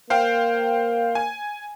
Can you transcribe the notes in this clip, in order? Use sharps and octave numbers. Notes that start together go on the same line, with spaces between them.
A#3 C5 F5 G5
G#5